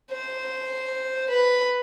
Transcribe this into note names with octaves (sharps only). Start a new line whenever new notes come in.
C5
B4